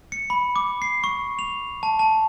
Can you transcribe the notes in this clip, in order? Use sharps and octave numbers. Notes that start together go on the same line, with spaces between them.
C#7
B5
D6
C7
C#6
F7
A5
A5